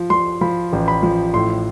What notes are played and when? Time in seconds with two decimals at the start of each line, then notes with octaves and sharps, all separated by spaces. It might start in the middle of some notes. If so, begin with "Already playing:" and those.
Already playing: F3
0.10 F3 C6
0.41 F3 B5
0.73 A1
0.88 B5
1.03 F3
1.34 A2 C6